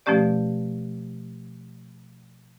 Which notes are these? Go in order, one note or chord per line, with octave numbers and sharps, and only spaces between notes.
B2 F3 A3 C#4 G4 D5